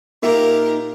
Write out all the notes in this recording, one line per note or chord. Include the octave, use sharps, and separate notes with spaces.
A#2 A#3 D#4 F4 G4 A#4 E5